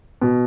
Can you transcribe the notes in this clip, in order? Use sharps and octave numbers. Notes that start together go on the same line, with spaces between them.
B2